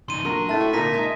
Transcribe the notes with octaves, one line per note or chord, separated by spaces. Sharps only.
C#3 D#4 C6 D#7
A#2 F#3 A3 D4 A#4
A2 E5 A5 A6
F#4 E5
A#2 D3 D#4 A#6 B6 D#7
G#3 D#4